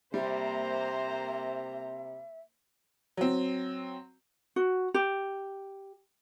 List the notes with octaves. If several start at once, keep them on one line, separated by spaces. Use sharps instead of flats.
C3 G3 A#3 C5 E5 A#5
F#3 C4
F#4
G4